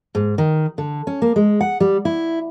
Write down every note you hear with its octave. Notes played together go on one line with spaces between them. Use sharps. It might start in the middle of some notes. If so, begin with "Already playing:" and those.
G#2
D#3
D3
C#4
A#3
G#3
F#5
G3
E4